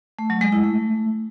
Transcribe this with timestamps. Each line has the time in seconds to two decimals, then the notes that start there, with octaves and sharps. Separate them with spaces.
0.19 A3
0.30 F#3
0.41 G#3
0.52 E4
0.64 A3